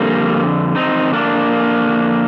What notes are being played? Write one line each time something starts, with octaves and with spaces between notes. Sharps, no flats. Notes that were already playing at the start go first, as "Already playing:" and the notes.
Already playing: F2 D3 G3 A#3
C4 D#4
A#3 D4